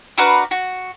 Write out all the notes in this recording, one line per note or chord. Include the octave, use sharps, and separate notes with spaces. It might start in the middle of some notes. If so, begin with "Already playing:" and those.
D4 F#4 A#4 B4
F#4